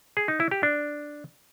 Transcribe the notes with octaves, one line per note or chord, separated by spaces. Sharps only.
G#4
D#4
E4
G4
D4